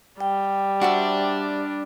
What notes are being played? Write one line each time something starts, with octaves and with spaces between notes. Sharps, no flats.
G3 G5
D4 F#4 C5 E5